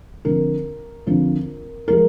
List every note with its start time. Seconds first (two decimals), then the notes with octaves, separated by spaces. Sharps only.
0.25 D3 F3 C4 A#4
1.07 D3 F3 C4
1.88 F3 G#3 A#4